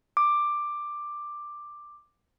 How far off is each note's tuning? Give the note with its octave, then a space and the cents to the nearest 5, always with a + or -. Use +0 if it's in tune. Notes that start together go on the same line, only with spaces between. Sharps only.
D6 +10